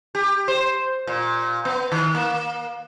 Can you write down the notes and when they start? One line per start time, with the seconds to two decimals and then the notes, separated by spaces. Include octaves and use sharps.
0.15 G4
0.48 C5
1.07 A#2
1.65 B3
1.92 D#3
2.15 A#3